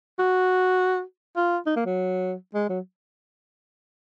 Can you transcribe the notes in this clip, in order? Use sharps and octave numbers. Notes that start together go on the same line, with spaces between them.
F#4
F4
D#4
A#3
F#3
G#3
F#3